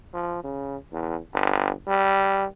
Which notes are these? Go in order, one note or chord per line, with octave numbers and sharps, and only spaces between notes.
F3
C#3
E2
G1
G3